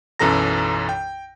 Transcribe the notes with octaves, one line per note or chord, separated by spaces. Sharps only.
B1 F#2 E3 A4 A#5 A#6
G5